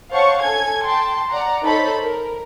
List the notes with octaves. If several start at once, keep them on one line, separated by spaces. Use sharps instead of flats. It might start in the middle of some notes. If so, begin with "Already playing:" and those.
C5 C#5 F5 F#5 A5 C#6
A4 G#5 G#6
G5 A5 C6
D5 F#5 A#5
D#4 A4 C5 C#5 A5 B5
A#4